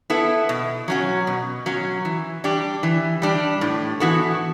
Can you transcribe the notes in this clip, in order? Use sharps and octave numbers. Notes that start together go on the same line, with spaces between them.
B3 E4 A4
B2
F#3 C#4 F#4
B2
F#3 C#4 F#4
E3
G3 D4 G4
E3
G3 D4 G4
A2
E3 B3 F#4 A4